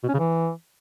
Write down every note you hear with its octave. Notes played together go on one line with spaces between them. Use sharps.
B2
C#4
C#3
E3